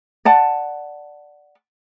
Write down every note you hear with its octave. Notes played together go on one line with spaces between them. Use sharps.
D5 F#5 A5